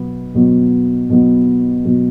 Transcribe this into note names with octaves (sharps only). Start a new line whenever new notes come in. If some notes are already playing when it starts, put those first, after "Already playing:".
Already playing: B2 F#3 B3
B2 F#3 B3
B2 F#3 B3
B2 F#3 B3